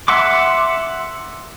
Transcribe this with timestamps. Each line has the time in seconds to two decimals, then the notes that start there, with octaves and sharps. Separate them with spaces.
0.08 E5 F#5 C6 D6